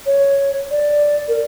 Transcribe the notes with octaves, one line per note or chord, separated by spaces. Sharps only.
C#5
D5
A#4